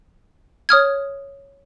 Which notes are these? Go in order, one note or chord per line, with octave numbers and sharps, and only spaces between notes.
C#5 D#6 F6 G#6